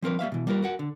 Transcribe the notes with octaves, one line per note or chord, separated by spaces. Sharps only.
F3 C4 A#4 B4
G3 A#3 E5 F5
B2 E3
G3 A#3 F4 A#4 B4
F#4 A#4 F#5
D3